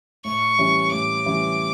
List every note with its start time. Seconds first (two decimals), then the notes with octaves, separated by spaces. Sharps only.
0.25 A2 C#6
0.58 E3 G3 C#4
0.91 A2 D6
1.26 E3 G3 C#4